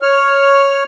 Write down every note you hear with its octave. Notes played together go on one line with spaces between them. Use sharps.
C#5 F6